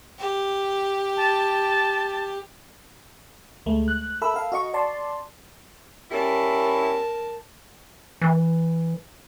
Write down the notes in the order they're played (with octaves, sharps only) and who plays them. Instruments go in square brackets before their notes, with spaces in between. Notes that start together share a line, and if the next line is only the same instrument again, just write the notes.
[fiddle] G4
[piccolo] A5
[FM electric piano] D2 G#3 A3
F#6
A4 A#4 E5 B5 E6
A4 F5
F#4 D#5 C#6
D5 A5 C6
[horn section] G3 C#4 E4 [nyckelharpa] A#4 A5
[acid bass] E3